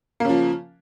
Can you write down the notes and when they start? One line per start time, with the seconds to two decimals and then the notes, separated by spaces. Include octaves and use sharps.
0.20 A#3
0.25 C#3
0.29 F3